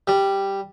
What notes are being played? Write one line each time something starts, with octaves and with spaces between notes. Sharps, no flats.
G3